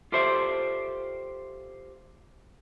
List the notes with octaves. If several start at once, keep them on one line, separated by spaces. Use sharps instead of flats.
F4 G4 A4 C5 D5 E5